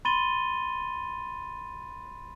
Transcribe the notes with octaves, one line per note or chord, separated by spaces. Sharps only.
B5 C6 A6 D#7 G7